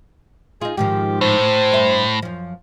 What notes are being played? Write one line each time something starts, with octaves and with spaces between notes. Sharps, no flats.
D#4 F4 G#4
G#2 D#3 F3 G4
A2 C5
G2 E5
F#2 F3